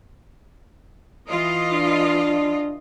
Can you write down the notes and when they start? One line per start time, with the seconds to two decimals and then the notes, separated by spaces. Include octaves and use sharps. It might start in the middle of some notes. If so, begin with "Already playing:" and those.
1.28 E3 F4 D#5
1.73 D4